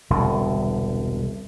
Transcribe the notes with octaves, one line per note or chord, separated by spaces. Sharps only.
E1 C2 D3